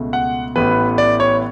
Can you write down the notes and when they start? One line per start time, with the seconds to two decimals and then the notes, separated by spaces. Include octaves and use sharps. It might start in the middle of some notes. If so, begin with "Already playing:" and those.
Already playing: C#2 B2 A3
0.13 F#5
0.56 A1 A2 E3 B3 B4
0.98 D5
1.20 C#5